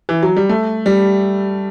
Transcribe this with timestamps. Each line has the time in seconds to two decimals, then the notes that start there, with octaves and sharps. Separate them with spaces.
0.09 E3
0.23 F#3
0.37 G3
0.49 A3
0.86 G3